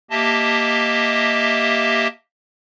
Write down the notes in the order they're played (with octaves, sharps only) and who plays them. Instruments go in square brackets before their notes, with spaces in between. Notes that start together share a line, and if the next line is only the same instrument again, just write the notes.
[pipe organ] A#3 G4 D#5 E5 A5